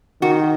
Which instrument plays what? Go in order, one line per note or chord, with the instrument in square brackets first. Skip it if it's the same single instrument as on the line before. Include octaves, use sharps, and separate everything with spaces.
[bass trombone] D#3 [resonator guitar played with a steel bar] F#4